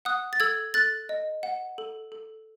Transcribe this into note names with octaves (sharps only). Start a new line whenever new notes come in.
F#5 D#6 F#6
A6
A4 E6 G#6
A4 F#6 A6
D#5
F#5
A4
A4